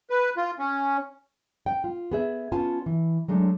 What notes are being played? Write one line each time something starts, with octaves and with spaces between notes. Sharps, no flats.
B4
F4
C#4
G5
F4
B3 G#4 E5
B3 C#4 F4 G#5 A5
E3
F#3 G#3 A3 D4